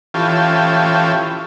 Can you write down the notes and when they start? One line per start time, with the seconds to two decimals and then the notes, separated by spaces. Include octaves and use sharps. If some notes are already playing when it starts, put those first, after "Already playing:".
0.14 E3 C#4 F4 G4 A4